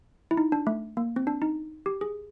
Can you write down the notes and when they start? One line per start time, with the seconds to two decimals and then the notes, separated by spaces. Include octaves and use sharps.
0.31 E4
0.37 D#4
0.52 D4
0.67 A3
0.97 A#3
1.16 C4
1.27 D4
1.42 D#4
1.86 G4
2.01 G#4